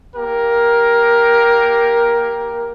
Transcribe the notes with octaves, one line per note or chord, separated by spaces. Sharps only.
A#3 G4 A#4